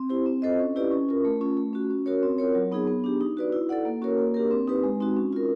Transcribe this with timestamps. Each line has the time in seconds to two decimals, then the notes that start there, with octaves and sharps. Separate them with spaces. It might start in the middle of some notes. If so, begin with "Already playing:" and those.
Already playing: C4
0.09 E4 G4 C5
0.26 C4
0.42 F4 A4 C5 D#5
0.59 C#4
0.76 E4 G4 B4 D5
0.91 C#4
1.09 F4 A#4
1.25 A3
1.41 C#4 F4
1.57 A3
1.73 C#4 F#4
1.90 C#4
2.06 F#4 A#4 C#5
2.23 C4
2.38 F4 A#4 C#5
2.55 F#3
2.72 B3 D#4 G#4
2.87 B3
3.04 D4 G4
3.21 D#4
3.37 F#4 B4 D5
3.52 E4
3.69 A4 D5 F#5
3.85 A#3
4.02 C#4 F#4 A#4 C#5
4.18 A#3
4.34 D4 G4 A#4
4.51 C4
4.68 D#4 G4 B4
4.84 G#3
5.00 C4 D#4 F#4
5.16 C#4
5.33 F4 A#4